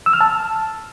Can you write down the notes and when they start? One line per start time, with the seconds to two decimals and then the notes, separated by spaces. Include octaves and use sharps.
0.06 E6
0.13 F6
0.21 A5